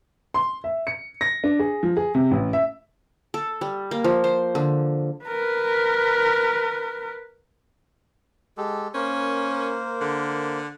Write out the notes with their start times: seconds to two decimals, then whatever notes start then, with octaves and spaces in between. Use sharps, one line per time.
0.34 C6
0.64 E5
0.87 C#7
1.21 A#6
1.44 D4
1.59 G#4
1.83 F3
1.97 G#4
2.15 C3
2.31 A1
2.53 E5
3.34 A4
3.61 G3
3.91 A#3
4.04 F3
4.24 C5
4.55 D3
5.25 A#4 B4
8.57 G#3 G4 A4
8.94 A#3 C#4 A#4 C5
10.01 D3